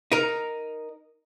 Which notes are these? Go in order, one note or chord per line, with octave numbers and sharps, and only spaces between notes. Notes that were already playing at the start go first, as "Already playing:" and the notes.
D#4 A#4